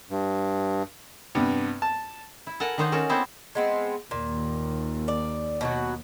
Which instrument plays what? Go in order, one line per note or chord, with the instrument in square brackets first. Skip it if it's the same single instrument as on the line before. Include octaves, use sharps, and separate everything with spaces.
[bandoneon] G2
[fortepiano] G2 C3 B3
A5
[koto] E4
A4 A#4 F#5 G#5
D#3 D4 D#4 C5 C#5 F#5
C#4 F#4 A4 A#4
B3 C4 E4 F#4 A4 C5
[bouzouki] G#3 B3 C4
[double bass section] D#2 [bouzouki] A#2
[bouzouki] D5
B2 F#3 F#4